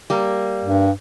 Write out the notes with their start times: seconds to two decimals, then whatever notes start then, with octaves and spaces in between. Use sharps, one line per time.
0.10 G3 A#3
0.65 G2